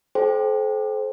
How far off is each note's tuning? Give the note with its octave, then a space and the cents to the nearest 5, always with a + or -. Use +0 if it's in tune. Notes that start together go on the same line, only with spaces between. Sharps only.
A4 -40 C5 +0 G5 +0